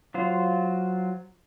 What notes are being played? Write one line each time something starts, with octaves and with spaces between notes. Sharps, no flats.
F#3 F4 C5